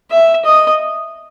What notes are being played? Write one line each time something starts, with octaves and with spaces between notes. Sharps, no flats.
E5
D#5